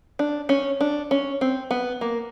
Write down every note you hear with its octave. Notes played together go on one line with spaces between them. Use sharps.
D4
C#4
D4
C#4
C4
B3
A#3